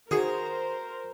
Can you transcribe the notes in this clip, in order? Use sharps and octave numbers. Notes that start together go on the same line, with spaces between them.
D#3 F#4 G#4 A#4 C5